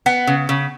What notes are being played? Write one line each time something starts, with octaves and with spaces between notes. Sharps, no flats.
B3 F#5
C#3
C#3